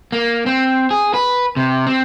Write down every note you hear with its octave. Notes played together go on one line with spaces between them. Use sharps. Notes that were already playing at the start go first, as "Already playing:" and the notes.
A#3
C4
G#4
B4
C3
C4